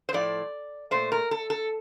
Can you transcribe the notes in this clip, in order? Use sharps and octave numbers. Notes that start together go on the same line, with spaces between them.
C5
A2 F3 A3 D5
A#2 A3 C5
A#4
A4
A4